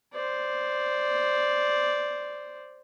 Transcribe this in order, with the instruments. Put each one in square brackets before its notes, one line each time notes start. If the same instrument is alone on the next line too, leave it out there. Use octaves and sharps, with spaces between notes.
[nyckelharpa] C5 D5